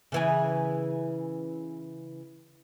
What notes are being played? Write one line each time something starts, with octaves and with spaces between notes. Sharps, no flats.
C#3 E3 G#4